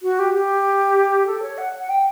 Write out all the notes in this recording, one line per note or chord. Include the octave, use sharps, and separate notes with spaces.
F#4
G4
G4
A4
C#5
F#5
F#5
G5